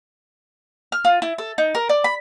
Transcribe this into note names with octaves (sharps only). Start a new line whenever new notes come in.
F6
F4
E4
A4
D#4
A#4
D5
B5